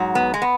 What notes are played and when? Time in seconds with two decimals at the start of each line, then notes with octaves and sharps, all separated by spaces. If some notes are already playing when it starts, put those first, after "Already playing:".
Already playing: G#2 F#3
0.15 B3
0.34 G#3
0.42 B3